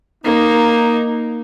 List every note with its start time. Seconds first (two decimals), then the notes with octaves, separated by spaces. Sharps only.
0.24 A#3 D#4